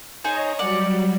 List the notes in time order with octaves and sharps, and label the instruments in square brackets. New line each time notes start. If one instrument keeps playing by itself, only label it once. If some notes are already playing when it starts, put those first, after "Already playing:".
[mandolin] D#4 G#4 C5 [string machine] C#5 D#5 A#5
[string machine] F#3 G3 [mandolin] D5 F#5